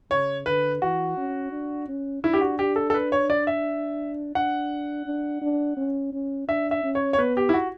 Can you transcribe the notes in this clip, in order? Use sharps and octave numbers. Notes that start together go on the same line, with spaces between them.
C#3 C#5
D3 B4
E3 F#4
C#4
D4
C#4
D4 E4
G4
F#4
G4
A4
A4
B4
C#5
D5
E5
D4 F#5
D4
D4
C#4
C#4
D4 E5
E5
C#4
C#5
C#5
B3 B4
G4
E4
F#4